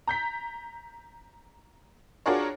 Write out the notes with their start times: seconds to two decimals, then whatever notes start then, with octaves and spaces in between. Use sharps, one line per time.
0.07 A#5 G6 B6
2.26 D4 F4 F#4 G#4 A#4 C#5